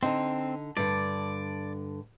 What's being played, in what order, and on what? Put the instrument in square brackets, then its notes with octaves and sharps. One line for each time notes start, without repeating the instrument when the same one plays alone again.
[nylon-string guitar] D3 D#4 [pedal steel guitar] C4
[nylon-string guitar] G2 D3 [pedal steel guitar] D5